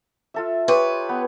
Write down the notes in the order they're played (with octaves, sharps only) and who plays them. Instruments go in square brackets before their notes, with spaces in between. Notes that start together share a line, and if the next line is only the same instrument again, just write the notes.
[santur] F4 A4 E5
[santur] G4 C#5 C6 [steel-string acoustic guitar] B4
[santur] B3